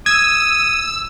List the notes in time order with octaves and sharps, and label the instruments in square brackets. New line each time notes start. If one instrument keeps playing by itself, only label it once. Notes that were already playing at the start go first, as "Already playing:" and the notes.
[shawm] D#6 [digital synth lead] E6 [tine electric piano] G#6